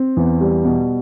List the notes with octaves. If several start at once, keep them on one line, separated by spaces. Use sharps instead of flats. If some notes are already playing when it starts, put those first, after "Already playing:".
Already playing: C4
E2
G3
B2